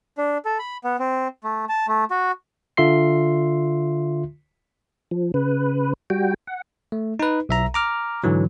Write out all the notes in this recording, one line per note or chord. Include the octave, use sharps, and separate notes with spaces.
D4
A4
B5
B3
C4
A3
A5
A3
F#4
D3 F4 E5 C6 C7
F3
C#3 B4
G3 F#4 G5
F#5
A3
D#4 B4
B1 E5 A#5
A#5 D6 F6
G#2 D3 E3 F#3